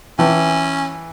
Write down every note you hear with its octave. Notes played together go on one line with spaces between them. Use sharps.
E3 C#4 G5 A5